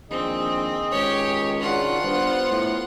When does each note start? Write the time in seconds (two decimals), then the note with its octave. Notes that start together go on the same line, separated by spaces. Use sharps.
0.10 A#1 D#3 C4 G#4 D#5
0.92 C#2 G4 C#5
1.60 C#3 D4 F4 F#4 F#5
2.03 G2 B3 C5
2.50 A2